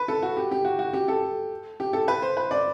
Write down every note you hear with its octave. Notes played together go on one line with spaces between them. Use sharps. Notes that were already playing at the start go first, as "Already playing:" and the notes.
Already playing: B4
A4
F#4
G4
G4
F#4
F#4
G4
A4
G4
A4
B4
C5
B4
D5